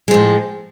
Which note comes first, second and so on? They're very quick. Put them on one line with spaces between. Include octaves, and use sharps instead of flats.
G#3 F3 A2